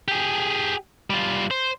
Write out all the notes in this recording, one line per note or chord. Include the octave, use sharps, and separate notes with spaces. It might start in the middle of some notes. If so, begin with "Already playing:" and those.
G4 G#4
G3 F4
C5